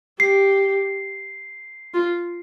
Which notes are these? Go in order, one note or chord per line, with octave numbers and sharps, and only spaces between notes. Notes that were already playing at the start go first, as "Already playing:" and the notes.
G4 C7
F4